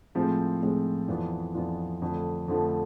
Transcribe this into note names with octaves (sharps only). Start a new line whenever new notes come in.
A2 F3 G#3 C4
A2 F3 G#3 C4
F2 E3 B3 D4 F4
F2 E3 B3 D4 F4
F2 D3 F3 A3
F2 D3 F3 A3